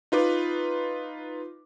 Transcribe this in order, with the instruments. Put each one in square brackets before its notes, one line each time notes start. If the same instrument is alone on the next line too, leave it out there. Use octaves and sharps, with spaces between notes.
[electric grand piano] D#4 F4 B4 D6